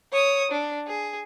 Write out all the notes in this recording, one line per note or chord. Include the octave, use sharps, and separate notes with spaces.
C#5 D#6
D4
G#4